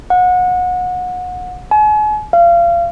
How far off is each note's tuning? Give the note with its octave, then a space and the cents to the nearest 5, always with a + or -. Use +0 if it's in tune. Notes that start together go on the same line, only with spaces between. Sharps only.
F#5 -30
G#5 +40
F5 -30